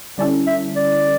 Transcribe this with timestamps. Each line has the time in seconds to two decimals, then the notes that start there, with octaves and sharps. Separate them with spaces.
0.18 D3 G3 C#4 E4 A4 D5
0.47 E5
0.76 D5